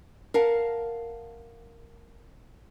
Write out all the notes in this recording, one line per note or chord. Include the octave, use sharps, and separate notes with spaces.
A#4 F5 F#5 A5